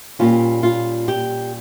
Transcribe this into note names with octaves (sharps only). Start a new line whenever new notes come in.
A#2 G3 C#4 F4
F4
G4